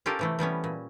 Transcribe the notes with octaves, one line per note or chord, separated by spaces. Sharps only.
C#4 F4 G4 A4 A#4
C3 E3 A3
E3 G3 B3 C#4
A#2